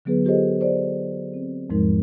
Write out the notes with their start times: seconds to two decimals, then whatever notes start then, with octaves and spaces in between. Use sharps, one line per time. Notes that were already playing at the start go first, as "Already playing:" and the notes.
0.05 D3 F#3 B3 G#4 B4
0.25 F4 G4 A4 C5 D#5
0.61 C5 D5
1.34 C4
1.70 E2 G#2 F3 G#3 D#4 A#4